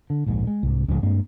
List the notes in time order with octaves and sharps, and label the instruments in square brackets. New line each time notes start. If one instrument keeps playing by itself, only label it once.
[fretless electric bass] D3
D1 A#1 G#2
G#3
C2 G#2
C#2 A2 F3 G#3
G2 G#3 A#3 C4